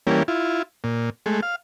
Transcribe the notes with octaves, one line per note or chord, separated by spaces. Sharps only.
E3 G3 A#3 C#4
E4 F4
A#2
G#3 A3
F5